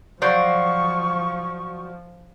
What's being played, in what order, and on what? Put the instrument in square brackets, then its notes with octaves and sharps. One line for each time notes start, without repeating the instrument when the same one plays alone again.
[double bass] F3 [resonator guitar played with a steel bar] F#3 C5 D5 [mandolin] F#4 F5 G6 [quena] C#6